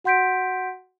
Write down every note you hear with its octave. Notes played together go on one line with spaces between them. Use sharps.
F#4 F#5 C6 G6 B6 D7